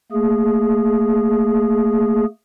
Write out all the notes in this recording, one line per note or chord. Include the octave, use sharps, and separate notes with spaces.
A3 A#3 G#4